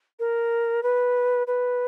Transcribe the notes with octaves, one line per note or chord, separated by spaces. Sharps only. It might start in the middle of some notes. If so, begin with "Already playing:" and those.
A#4
B4
B4